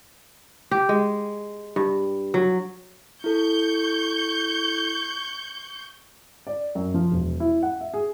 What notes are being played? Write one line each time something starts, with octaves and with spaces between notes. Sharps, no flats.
G4
G#3
G2
F#3
E4 A4 C#6 G6
D5
F#2
F3
E1
E4
F#5
E5
G#4